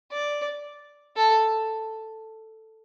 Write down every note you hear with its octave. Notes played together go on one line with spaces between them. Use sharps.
D5
A4